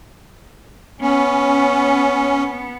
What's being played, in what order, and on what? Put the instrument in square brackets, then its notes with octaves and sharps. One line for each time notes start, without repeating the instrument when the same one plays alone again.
[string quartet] B3 [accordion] C#4